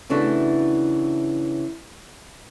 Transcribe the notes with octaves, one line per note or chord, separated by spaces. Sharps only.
C#3 E3 A3 D4 F#4